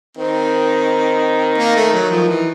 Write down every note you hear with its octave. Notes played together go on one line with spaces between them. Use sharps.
D#3 C4
A#3
A3
F#3
F3
E3